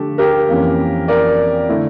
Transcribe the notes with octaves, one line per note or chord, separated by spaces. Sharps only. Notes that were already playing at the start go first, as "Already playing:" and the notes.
Already playing: D3 F3 A3 D4 G4 A4
G4 A#4
F2 E3 A#3 C#4
A#4 D5
D3 A3 E4